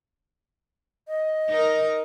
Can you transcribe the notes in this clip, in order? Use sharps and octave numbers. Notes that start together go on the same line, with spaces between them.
D#5
D#4 A#4